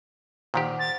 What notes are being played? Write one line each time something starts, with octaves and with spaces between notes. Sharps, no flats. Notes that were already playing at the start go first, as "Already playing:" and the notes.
A#2 D#3 G4 C5 F#5
A6